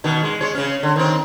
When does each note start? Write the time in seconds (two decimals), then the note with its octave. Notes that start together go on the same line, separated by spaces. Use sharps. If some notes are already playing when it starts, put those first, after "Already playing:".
0.04 B2 D#3
0.23 G#3
0.41 G#3 C#5
0.55 C#3 C#4
0.83 D3
0.96 D#3 C4